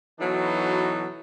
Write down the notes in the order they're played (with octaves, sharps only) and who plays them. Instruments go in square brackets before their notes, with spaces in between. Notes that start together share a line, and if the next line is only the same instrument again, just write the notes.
[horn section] B2 E3 F#3 D#4 A4